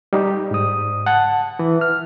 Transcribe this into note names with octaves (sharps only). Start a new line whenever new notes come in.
G3 D#4 G4
G#2 D#6
F#5 A5
E3
F6